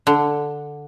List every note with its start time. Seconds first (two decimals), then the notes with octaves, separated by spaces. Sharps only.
0.07 D3